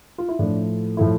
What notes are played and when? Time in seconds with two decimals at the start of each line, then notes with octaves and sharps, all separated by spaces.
0.18 F4
0.29 E4
0.39 A2 F3 A3 D4
0.97 A2 F3 A3 E4